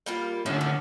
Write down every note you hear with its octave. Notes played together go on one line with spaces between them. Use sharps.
G3 A#3 F4
A2 D3 C#4 E5
C#4